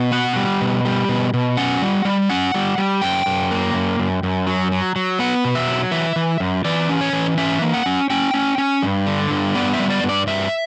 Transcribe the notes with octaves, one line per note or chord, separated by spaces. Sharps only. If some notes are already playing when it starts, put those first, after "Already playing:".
Already playing: B2
B3 F#5
G3
B2
G3
B2
B2
C#4 F#5
G3
G3
C#4 F#5
G3
G3
F#2 G5
F#2
A#3
F#2
F#2
F#2
F#3
F#3
F#3
B3 F#5
B2
E5
F#3
E3 E5
E3
F#2
E3 D5
C#4
C#5
E3
C#4 E5
A#3
F#5
C#4
C#4 G5
C#4
C#4
G2
D3
G2
B3 D5
E5
G3
D5
G2
D5
G2 E5